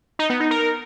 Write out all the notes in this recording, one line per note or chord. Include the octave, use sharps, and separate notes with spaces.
D#4
B3
D#4
A#4